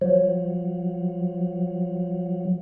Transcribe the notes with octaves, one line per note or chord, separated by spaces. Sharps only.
F3 F#3